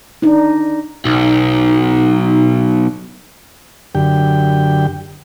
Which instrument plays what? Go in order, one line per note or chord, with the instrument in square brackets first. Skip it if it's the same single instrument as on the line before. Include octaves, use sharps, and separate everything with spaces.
[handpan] D4 D#4
[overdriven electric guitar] B1 [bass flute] D#4
[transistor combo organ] F#2 D3 G4 G5